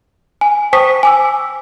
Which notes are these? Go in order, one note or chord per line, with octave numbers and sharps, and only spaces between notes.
G#5
C5 G5 A5 C#6 D#6 B6
G#5 D6 E6